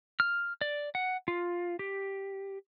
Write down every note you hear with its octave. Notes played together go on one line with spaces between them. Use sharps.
F6
D5
F#5
F4
G4